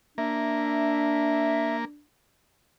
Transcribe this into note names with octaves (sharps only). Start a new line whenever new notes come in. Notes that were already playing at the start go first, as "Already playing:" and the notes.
A#3 D4 E5